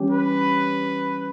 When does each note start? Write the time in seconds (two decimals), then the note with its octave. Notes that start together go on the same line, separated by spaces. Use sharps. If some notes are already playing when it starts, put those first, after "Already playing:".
Already playing: E3 G3 C#4 G4
0.11 B4